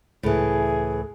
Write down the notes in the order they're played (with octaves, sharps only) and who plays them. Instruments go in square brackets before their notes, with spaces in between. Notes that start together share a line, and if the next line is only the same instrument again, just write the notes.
[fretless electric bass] C#2 [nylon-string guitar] A2 E3 [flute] G#4